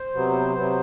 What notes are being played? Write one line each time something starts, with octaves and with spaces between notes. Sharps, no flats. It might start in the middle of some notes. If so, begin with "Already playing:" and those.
Already playing: C5
C3 F#3 B3
C3 F#3 B3